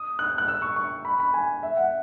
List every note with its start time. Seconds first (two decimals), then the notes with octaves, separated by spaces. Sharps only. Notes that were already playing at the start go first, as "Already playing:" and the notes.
Already playing: D#6
0.19 F#6
0.38 F#6
0.48 E6
0.62 C#6
0.76 C#6
1.05 B5
1.20 B5
1.34 G#5
1.63 E5
1.77 F#5